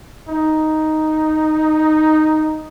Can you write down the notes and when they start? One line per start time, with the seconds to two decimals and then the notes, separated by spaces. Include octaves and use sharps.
0.29 D#4